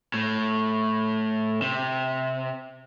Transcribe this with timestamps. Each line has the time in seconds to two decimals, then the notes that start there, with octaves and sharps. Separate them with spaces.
0.14 A2
1.62 C3